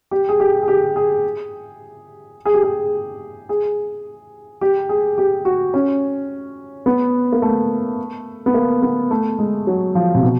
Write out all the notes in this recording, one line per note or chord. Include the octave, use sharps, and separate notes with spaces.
G4
G#4
G4
G#4
G4
G#4
G#4
G4
G#4
G#4
G4
G#4
G4
F#4
C#4
B3
A#3
A3
B3
A#3
B3
A3
G#3
F#3
F3
C3
B2